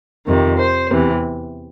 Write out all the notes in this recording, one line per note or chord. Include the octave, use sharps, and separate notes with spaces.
F2 C3 D#3
C5
E2 C3 E3